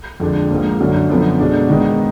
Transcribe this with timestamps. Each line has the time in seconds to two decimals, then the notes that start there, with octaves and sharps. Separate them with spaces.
0.20 F2 D3 G#3 D4
0.50 G#2 F3 A#3
0.79 F#2 D3 F#3 D4
1.09 F#2 D3 F3 B3
1.39 B2 G#3 D4
1.69 G#2 D#3 G#3 B3 D#4